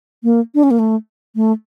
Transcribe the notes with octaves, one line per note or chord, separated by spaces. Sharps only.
A#3
D4
C#4
A#3
A3
A3